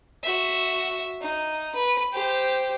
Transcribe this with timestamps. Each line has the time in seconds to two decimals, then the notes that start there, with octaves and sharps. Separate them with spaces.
0.23 F#4 E5
1.21 D#4
1.75 B4
2.13 G4 C5